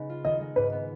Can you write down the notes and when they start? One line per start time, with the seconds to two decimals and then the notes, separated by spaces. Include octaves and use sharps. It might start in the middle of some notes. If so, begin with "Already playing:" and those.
Already playing: C#3 G#3 B3 D#4
0.09 F4
0.25 D#3 D#5
0.40 G#3
0.56 G#2 B4
0.72 B3